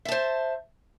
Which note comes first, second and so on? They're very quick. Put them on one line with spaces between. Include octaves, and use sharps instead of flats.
E5 A5 C5